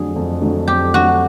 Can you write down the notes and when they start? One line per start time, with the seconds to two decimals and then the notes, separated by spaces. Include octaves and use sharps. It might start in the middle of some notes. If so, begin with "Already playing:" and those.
Already playing: F2 D3 F#3 A3 G#4
0.16 F2
0.41 D3 F#3 A3
0.68 F2 G4
0.94 D3 F#3 A3 F#4